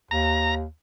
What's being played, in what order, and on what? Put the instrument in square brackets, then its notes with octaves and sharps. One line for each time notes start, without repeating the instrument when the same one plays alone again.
[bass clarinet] D#2 [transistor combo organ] A#5